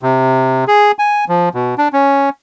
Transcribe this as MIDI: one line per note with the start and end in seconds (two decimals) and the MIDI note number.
0.02 0.64 48
0.68 0.92 68
0.99 1.25 80
1.29 1.49 53
1.54 1.75 47
1.78 1.88 62
1.93 2.29 61